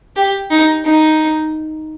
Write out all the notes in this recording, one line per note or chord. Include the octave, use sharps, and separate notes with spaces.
G4
D#4
D#4